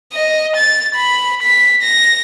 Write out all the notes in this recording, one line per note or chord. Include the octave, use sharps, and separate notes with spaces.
D#5
A6
B5
B6
A#6